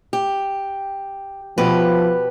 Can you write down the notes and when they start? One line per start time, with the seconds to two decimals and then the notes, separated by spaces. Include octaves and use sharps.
0.13 G4
1.58 B2 F3 G4 B4